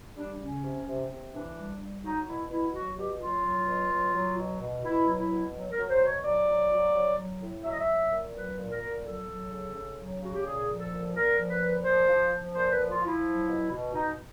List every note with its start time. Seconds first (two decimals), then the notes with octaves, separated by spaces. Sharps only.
0.16 G3 D4
0.39 C#3 C#4
0.63 C3
0.86 C3
1.10 C3
1.33 E3 D4
1.57 G3
1.80 G3
2.04 F#3 D#4
2.27 B2 E4
2.50 B2 E4
2.74 F#3 F#4
2.97 B2 G4
3.20 F#3 F4
3.44 F#3
3.68 B2
3.91 F#3
4.14 F#3
4.37 B2
4.60 B2
4.84 B2 E4
5.07 F#3
5.19 E4
5.31 B2
5.54 F#3
5.71 A#4
5.77 F#3
5.90 C5
6.00 B2
6.06 C#5
6.23 F#3 D5
6.47 F#3
6.71 F#3
6.95 F#3
7.17 F#3
7.41 A2
7.64 F#3 E5
7.72 D#5
7.78 E5
7.87 F#3
8.11 A#2
8.34 F#3 B4
8.57 A#2
8.70 A#4
8.81 A#2
9.05 F#3 A4
9.28 F#3
9.51 C#3
9.75 C#3
9.97 F#3
10.20 C#3 F#4
10.34 G4
10.45 A#2 G#4
10.68 F3
10.79 A4
10.91 A#2
11.15 A#2 A#4
11.38 F3
11.49 B4
11.61 A#2
11.84 F3 C5
12.08 F3
12.31 F3
12.55 A#2 C5
12.72 B4
12.77 F3
12.90 F4
13.01 F3
13.07 E4
13.24 F#3
13.49 B2
13.71 B2
13.94 B2 D#4